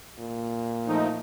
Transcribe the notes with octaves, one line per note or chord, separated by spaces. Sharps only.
A#2
F3 A3 D#4